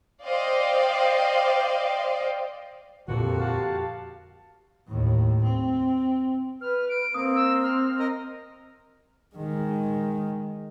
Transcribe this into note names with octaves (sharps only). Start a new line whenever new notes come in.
C5 D5 D#5 F5 G5
F2 A#2 D3 F3 A#3 F#4 G4 A4
G4 F5 A5
D#2 A2
C4
B4 F6
D7
A#3 C4 D#6
E6
F6
A#4 D#5 D#6
D#3 G#3